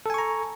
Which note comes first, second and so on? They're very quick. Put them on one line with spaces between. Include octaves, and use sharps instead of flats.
A4 G#5 C#6 A#5